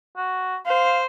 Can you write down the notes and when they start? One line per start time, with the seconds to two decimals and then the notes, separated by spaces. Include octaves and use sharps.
0.17 F#4
0.66 C5 F5